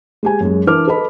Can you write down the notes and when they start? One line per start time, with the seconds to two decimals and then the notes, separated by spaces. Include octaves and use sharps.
0.23 G#3 G4 G#5
0.40 F#2 G#3
0.67 E3 D4 A#4 D6 F6
0.87 A4 B4 D#5 B5